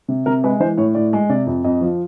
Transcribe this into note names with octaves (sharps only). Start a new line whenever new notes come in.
C3
C3 A#4
G#3 B4
E3 C5
A2 C#5
A2 D5
G#3
C3 D5
F2
F2 D#5
F3